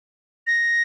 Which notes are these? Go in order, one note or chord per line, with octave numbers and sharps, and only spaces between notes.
A#6